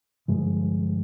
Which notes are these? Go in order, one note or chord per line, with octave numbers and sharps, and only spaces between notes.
G2 D3 F3 G#3